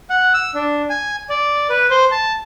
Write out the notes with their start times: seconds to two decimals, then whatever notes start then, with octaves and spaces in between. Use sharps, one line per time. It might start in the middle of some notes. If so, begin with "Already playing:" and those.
0.10 F#5
0.34 E6
0.55 D4
0.90 G#5
1.30 D5
1.70 B4
1.90 C5
2.12 A5